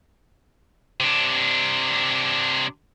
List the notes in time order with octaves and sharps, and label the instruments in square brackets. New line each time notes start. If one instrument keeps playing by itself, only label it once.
[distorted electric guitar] C3 D4